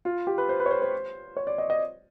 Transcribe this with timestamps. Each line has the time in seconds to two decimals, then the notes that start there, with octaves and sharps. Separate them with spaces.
0.05 F4
0.27 G4
0.38 B4
0.49 C5
0.60 B4
0.66 C#5
0.71 C5
0.82 C5
1.37 C#5
1.47 D5
1.58 D#5
1.70 D#5